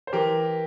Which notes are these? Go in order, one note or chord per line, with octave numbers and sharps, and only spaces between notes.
C5
E3 G4 A#4